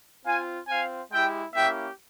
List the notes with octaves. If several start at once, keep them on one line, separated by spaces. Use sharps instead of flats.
C4 F4 F5 G#5
C4 F4 F5 G#5
G#3 E4 G4 E5 G5
A#3 C#4 E4 G4 E5 G5